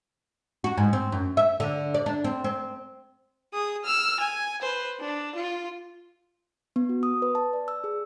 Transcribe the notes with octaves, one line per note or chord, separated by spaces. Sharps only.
F#4
G#2
C4
F#2
E5
D3
D5
D4
C4
C4
G#4 D#6
E6 F6
G#5
B4 C5
D4
F4
B3
F#4
D#6
B4
A5
D5
E6
G#4